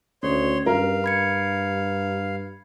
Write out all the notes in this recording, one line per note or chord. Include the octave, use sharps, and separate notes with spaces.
D2 C#4 C#5 C6
G2 A#4 F5
B5 G#6 C#7